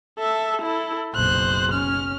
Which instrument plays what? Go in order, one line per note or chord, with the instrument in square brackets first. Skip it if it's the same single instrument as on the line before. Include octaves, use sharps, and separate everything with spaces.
[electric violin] A4 E5
E4 A4
[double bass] F#1 B1 [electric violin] C5 F#6
[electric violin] C#4 F6